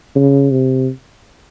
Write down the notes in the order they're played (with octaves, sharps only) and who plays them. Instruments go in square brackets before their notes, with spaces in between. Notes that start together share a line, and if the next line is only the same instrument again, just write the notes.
[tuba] C#3
C3